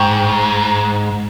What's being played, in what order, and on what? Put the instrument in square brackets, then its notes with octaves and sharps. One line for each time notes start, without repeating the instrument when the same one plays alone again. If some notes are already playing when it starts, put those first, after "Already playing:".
Already playing: [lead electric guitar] G#2 [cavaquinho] C5 G5 C#6